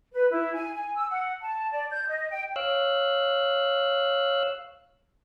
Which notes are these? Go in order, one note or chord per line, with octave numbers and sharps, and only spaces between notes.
B4
E4
G#5
G#5
E6
F#5
A5
D5
G6
D#5
G5
C#5 F5 E6 F#6